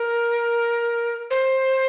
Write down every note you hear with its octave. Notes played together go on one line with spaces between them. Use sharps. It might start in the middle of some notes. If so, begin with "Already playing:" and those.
Already playing: A#4
C5